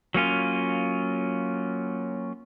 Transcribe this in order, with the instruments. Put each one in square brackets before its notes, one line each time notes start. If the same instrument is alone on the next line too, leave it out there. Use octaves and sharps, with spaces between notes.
[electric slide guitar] F#3 A#3 C#4 F4